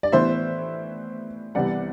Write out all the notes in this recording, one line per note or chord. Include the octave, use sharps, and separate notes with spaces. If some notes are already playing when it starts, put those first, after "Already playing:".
D5
A2 E3 B3 C5 E5
C2 C3 E3 B3 E4 D5 F#5